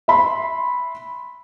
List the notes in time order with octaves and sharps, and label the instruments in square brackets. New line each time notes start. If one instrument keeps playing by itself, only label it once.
[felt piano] E5 B5 C6